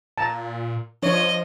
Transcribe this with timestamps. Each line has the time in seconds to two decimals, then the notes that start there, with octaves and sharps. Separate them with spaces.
0.18 A#2 A5 A#5
1.02 F3 D4 C#5 D#5